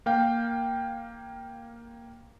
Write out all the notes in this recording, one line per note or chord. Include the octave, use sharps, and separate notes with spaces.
A#3 F5 G5